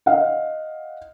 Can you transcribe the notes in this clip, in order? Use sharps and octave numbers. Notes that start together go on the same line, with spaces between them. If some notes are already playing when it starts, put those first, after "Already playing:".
D#5 F5 F#5